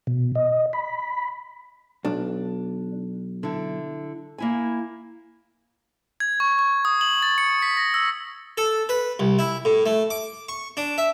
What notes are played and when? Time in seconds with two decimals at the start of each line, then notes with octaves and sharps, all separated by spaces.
0.07 B2
0.35 D#5
0.73 B5
2.05 B1 D4
3.43 D3 E4
4.38 A#3 E4 G#5
6.20 G#6
6.40 C#6
6.59 C#6
6.85 D#6
7.01 F#7
7.23 A6
7.38 C#7
7.62 B6
7.77 A#6
7.94 E6
8.58 A4
8.89 B4
9.19 C2
9.39 E4
9.65 A2
9.86 A3
10.10 D6
10.49 C#6
10.77 D4
10.98 E5